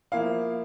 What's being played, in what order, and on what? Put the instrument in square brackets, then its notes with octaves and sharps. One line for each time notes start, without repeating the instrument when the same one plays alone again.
[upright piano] F3 A#3 E4 F5